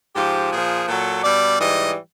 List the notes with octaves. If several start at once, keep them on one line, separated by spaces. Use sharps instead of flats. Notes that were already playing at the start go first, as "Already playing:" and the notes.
G#2 F3 G4
A#2 F3 G#4
A#2 F#3 A4
B2 G3 D5
G#2 E3 G3 D#5